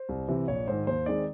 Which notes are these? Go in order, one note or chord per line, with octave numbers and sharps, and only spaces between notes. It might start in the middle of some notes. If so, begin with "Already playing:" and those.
Already playing: C5
C2
C3 E3
A#1 C#5
G#2 D#3 C5
D#2 C5
D#3 G#3 C4 D5